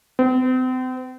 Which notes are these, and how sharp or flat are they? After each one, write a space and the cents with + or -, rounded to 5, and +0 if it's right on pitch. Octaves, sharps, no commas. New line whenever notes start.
C4 -40